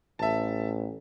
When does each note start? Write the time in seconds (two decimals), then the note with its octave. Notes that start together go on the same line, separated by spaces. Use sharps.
0.19 A1 E5 A5